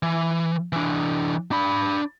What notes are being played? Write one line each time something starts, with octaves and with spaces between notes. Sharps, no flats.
E3
E3 D4
D4 B5